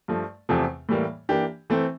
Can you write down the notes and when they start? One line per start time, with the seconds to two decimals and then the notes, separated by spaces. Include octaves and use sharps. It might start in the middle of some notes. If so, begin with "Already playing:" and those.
0.08 G2 F3 A3
0.49 E2 C3 F3 A3 C4
0.89 A2 E3 G3 A#3
1.29 E3 A#3 D4 G4
1.70 E3 A3 C4